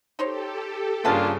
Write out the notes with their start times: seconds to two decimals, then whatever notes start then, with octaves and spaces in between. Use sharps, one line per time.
0.19 D#4 G4 A4 C5 C#5
1.05 G2 C#3 A#3 D4 F4 B4 F#5 A5